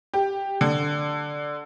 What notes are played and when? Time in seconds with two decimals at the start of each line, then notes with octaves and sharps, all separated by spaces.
0.14 G4
0.61 D3